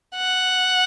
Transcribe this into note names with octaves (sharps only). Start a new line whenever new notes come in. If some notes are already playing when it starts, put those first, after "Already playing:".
F#5